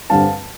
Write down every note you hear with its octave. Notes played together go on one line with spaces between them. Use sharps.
G2 D3 G3 C4 F5 A5